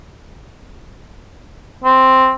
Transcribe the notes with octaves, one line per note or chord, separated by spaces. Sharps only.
C4